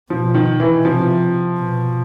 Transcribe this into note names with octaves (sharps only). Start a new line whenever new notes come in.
B2 F3
D#3
E3
C3 F3
B2